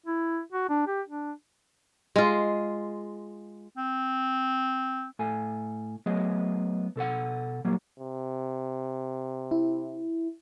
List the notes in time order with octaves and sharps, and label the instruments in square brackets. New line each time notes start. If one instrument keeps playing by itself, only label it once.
[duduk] E4
F#4
D4
G4
D4
[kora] G#3 F4
[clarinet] C4
[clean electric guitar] A2 A4 G#5
F#3 A3 B3 G#4 D#5
B2 A4 C5 F#5
A#2 F#3 G3 A#3
[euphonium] C3
[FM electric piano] E4